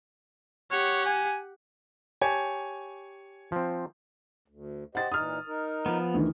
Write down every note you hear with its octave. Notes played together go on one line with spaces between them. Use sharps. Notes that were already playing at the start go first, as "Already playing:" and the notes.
G4 C#5 F#5
G#5
G4 C#5 G#5 A5
F3 C4
D2
G4 C5 D#5 F#5 A6
A#2 E3 D#4 D#6 F6
D#4 A#4
F3 B3
D2 D#3 E3